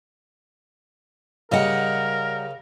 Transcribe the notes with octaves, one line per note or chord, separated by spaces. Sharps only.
C#3 G3 A#4 D#5 F#5